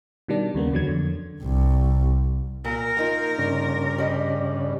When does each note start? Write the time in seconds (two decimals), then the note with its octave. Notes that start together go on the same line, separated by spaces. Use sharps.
0.28 B2 D#3 G3 D4
0.55 D#2 C#3 A#3 B3
0.72 E2 D3 F#3 G#6
0.87 F2 D3
1.43 C2
2.65 A#2 A#4
2.97 A#3 D#4 F4
3.38 G2 C#3 D4
3.98 G3 D#5